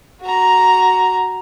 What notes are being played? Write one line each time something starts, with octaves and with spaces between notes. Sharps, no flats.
F#4 A#5